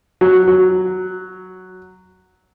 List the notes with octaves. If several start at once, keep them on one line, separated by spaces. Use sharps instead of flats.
F#3
F#3